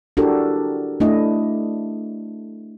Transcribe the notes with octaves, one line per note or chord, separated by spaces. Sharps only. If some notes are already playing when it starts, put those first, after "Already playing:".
D4 E4 F#4 G4 A4 A#4
A3 D4 E4 D#5